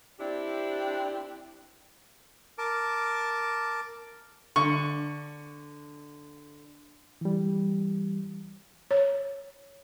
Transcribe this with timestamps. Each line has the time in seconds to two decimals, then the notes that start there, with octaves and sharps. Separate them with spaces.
0.19 C4 D4 E4 G4
2.58 A#4 A5 D6
4.56 D3 C#6
7.21 E3 G3
8.91 C#5